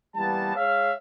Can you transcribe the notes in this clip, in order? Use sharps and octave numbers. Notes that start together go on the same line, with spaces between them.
E3 G3 A#3 B3 A5
G#3 C#5 E5 F5